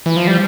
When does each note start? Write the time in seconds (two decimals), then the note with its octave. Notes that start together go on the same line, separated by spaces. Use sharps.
0.06 E3
0.16 F3
0.27 G3